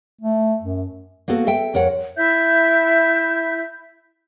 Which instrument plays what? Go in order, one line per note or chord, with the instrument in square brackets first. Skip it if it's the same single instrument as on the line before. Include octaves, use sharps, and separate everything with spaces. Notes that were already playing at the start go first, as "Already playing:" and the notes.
[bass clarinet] A3
F#2
[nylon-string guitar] A#3 B3 F#4 A4
A4 E5 G5
F2 A#4 C#5 F#5
[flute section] E4 E5 G6